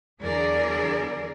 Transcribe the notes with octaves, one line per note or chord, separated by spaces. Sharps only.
E2 D3 F#3 G#4 A#4 D5